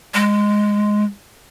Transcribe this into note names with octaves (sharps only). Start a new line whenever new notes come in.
G#3